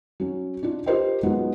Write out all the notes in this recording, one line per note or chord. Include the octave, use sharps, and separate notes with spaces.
F#3 C#4
D4 D#4 F4
F4 G4 A#4 C5 D#5 G5
F#3 G#3 B3 D#4 F4